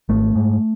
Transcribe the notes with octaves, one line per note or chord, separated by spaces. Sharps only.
G#1 A3
G#2